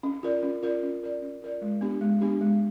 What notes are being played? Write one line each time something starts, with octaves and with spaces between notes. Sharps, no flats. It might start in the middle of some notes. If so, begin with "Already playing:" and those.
C#4
F4 A#4 D5
C#4
F4 A#4 D5
C#4
F4 A#4 D5
C#4
F4 A#4 D5
G#3
B3 D4 G4
G#3
B3 D4 G4
G#3